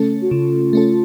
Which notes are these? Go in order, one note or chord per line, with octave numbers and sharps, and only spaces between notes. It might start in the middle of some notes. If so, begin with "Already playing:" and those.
Already playing: C#3 A3 C#4 A4
F#4
C#3 F4
A3 C#4 A4